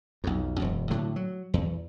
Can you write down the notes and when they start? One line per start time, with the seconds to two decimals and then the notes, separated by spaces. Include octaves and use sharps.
0.24 B1 F2
0.59 E1 F#2
0.90 A2 D3 F#3
1.16 F#3
1.54 E2